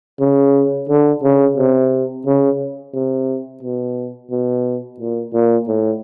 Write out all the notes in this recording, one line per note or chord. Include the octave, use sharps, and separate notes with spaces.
C#3
D3
C#3
C3
C#3
C3
B2
B2
A#2
A#2
A2